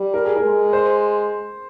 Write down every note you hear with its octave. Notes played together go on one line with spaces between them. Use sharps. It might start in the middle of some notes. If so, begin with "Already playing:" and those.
Already playing: G3
A#4
G#4
A#4
G#3
C5